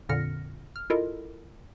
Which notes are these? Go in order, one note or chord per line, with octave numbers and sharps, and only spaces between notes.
F2 A#2 D3 F6 A#6 C#7
F6
E4 F4 A4 A#4 D#5